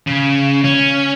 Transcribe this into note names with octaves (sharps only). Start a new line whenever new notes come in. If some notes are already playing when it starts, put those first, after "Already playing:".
C#3
C#4